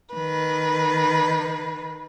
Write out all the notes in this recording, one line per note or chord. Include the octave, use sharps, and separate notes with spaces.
D#3 B4